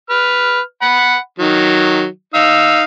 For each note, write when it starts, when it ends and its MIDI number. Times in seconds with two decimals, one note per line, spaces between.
0.10 0.60 71
0.10 0.60 89
0.82 1.16 78
0.82 1.16 83
1.39 2.06 51
1.39 2.06 54
2.34 2.83 63
2.34 2.83 77
2.34 2.83 88